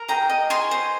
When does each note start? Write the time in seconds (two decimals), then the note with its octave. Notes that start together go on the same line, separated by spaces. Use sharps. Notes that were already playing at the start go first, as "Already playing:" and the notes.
Already playing: A#4
0.08 G#4 G5 A#5
0.29 D#5
0.50 G#4 G#5 C6
0.71 C5